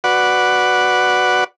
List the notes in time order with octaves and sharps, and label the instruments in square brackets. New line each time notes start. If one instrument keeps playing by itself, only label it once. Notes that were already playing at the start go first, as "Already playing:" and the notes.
[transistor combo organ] F#4 B4 D5 F#5